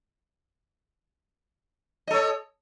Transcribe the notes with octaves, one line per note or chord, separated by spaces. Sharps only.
A4 C#5 D#5